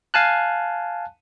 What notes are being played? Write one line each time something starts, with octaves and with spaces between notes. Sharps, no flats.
F5 G#5 A5 F#6